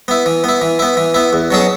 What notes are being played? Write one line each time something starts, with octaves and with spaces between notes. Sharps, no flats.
B3 E4
E3
B3 E4
E3
B3 E4
E3
B3 E4
E2
B2 F#3 C#4 G#4